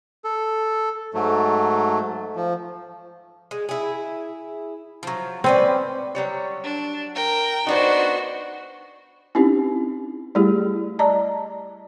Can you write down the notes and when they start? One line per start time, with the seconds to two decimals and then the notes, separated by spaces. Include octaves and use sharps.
0.25 A4
1.14 G#2 F#3 A3
2.36 F3
3.51 G#3
3.69 E4 G#4
5.03 F3 F#3
5.44 C4 C#4 B4 D5
6.15 F#3 G3 C#5
6.64 D4
7.15 A#4 G5
7.67 B3 D4 D#4 F#4 C5
9.35 C4 C#4 D#4 E4 G4
10.35 G3 A3 E4 G4 G#4
10.99 D5 D#5 A5 A#5